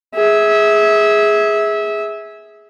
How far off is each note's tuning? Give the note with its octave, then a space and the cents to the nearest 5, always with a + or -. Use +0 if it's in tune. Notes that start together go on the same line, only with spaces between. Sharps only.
G#4 +0 E5 -20